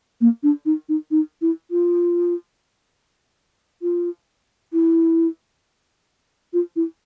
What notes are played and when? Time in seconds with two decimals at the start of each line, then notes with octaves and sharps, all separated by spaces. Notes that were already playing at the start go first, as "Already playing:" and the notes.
0.21 A#3
0.43 D4
0.66 D#4
0.89 D#4
1.11 D#4
1.42 E4
1.71 F4
3.82 F4
4.73 E4
6.53 F4
6.76 E4